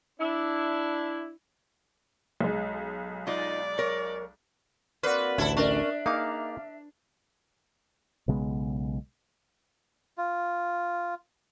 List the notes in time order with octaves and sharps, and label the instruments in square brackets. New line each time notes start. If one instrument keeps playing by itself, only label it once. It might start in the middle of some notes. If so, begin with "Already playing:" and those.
[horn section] D4 E4
[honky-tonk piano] B1 G#3
[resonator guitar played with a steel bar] D#4 F4 [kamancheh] D5
[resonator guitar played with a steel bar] A#4 C#5
[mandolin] A#3 C4 F#4 [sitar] B4 [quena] D5
[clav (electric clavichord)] A1 D2 [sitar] E4 A4
[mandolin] C#4 A#4 D#5 [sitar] D4 [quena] E5
[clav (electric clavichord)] A#3 D#4 G#4 [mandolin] F5 D6
[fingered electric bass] B1 C#3 G#3 B3
[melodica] F4